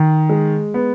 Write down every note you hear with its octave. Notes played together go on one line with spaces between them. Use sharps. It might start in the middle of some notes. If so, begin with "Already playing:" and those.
Already playing: D#3
G#3
B3